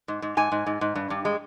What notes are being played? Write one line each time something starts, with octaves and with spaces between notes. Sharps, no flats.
G#2
G#2
G#2 G#5
G#2
G#2
G#2
G2
G2
G#3